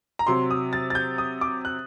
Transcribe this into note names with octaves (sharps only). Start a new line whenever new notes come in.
A#5
C3 F#3 C6
D#6
A6
A6
G6
D#6
D6
F#6